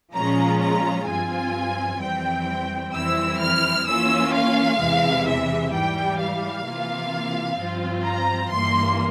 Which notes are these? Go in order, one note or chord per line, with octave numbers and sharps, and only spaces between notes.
A#2 F3 G#3 C#4 F4 A#5
A#5
G2 F3 C4 F4 G#5
F2 E3 G3 C4 G5
F2 E3 G3 C4 E4 E6
F6
E3 A#3 C#4 F4 E6
F5
E2 C3 E3 G#3
E5
G#2 E3 G3 G5
F5
C3 E3 A#3 F4
G2 F3 C4 F4
A#5
G2 E3 A#3 C6